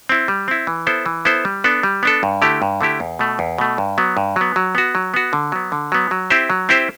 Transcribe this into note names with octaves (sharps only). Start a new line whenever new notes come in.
C4 E4
G3
C4 E4
E3
B3 E4 A4 C5
E3
B3 E4 A4 C5
G3
B3 D4 A4
G3
B3 D4 A4
G2
D3 A3 E4 G4
G2
D3 A3 E4 G4
E2
B2 A3
E2
B2 A3
G2
F#3 B3
G2
F#3 B3
F#3
B3 F#4
F#3
B3 F#4
D3
F#3 B3
D3
F#3 B3
F#3
C4 E4 G4 C5
F#3
C4 E4 G4 C5